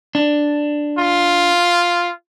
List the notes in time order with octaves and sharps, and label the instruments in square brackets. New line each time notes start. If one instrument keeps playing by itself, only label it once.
[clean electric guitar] D4
[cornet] F4